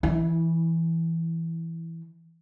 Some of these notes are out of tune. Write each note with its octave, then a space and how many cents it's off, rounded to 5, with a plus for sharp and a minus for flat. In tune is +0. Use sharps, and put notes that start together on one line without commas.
E3 +0 E4 -20